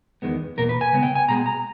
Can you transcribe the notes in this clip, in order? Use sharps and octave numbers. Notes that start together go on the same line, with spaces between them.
E2 D#3 G#3 B3
E2 B2 A#3 A#4
B4
G#5
C#3 G#3 B3
G5
G#5
B2 G#3 B3 A#5
A#5